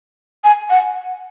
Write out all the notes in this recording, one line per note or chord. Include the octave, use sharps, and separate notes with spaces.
G#5
F#5